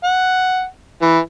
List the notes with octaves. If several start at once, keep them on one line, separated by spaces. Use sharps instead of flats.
F#5
E3